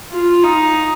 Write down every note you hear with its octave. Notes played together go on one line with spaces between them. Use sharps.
F4
D#4